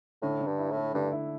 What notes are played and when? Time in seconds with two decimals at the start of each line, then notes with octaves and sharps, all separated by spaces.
0.22 A2 D3
0.40 D3
0.47 G2
0.58 E4
0.71 A2
0.77 A3
0.94 G2 D3
1.12 E4